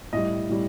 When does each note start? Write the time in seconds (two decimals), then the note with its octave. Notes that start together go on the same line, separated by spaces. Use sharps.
0.13 A2 G3 D#5
0.49 A2 G3